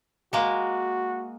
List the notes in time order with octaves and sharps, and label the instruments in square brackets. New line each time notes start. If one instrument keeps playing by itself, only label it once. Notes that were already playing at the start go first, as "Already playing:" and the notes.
[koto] G#3 A#3 [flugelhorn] F#4